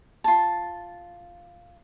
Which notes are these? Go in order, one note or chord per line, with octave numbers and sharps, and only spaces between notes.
F4 A5